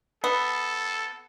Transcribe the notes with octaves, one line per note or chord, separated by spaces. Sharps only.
B3 A4